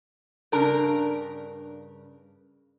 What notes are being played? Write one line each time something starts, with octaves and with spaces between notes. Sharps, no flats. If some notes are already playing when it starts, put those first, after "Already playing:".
G2 C#3 D4 A#4 A#5